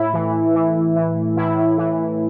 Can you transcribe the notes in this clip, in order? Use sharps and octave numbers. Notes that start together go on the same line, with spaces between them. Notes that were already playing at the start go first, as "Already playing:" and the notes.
Already playing: A2 E4
E3
E3
E3
A2 E4
E3